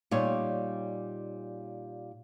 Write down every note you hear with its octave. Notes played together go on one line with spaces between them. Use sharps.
A#2 G3 D#4 C#5